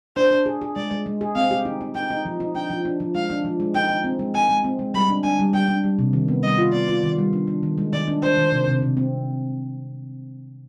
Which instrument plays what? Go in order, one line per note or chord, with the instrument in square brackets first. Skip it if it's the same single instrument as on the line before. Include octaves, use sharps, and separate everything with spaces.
[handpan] D4 [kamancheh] C5
[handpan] D4
G#4
G#4
[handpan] G#3 [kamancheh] D5
[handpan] G#3
G#3
G#4
[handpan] C4 [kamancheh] F5
[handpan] G4
D#4
D#4
[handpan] D#4 [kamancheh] G5
[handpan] D#4
F3
D#4
[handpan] D4 [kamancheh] G5
[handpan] F3
D4
F3
[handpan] G#3 [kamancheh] F5
[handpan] D4
F3
G#3
[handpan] D#4 [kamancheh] G5
[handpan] D#4
C4
G#3
[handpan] D#4 [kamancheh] G#5
[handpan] G#3
C4
G#3
[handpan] G3 [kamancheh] B5
[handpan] D4
[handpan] D4 [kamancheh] G#5
[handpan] G3
[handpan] G3 [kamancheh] G5
[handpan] D4
G3
C3
D#3
B3
[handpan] G3 [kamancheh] D#5
[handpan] F4
[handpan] B3 [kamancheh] D5
[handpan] F4
D#3
G3
D4
D4
D#3
G#3
[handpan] D#3 [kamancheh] D5
[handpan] D4
[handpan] D4 [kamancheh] C5
[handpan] D#3
C3
C3
C3
C4